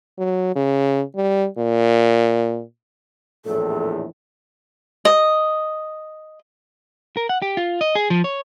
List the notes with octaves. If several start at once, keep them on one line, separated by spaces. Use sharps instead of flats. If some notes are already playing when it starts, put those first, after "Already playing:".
F#3
C#3
G3
A#2
A#1 E2 A2 A4
D#5
A#4
F#5
G4
F4
D#5
G#4
F3
C#5